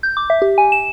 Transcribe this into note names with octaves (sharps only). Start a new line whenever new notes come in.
G6
D6
E5
G4
G#5
E7